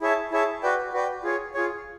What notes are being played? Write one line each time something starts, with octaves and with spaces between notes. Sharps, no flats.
E4 G#4 C#5 E5 A5
E4 G#4 C#5 E5 A5
F#4 B4 D5 G5
F#4 B4 D5 G5
F4 G#4 C#5
F4 G#4 C#5